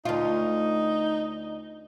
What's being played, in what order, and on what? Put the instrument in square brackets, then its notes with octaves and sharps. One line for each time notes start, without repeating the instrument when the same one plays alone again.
[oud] D2 F4 [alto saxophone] D#4